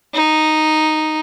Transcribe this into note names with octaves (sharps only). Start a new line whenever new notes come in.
D#4